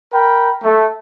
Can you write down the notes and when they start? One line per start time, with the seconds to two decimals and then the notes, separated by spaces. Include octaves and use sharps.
0.13 A#4 G5 B5
0.64 A3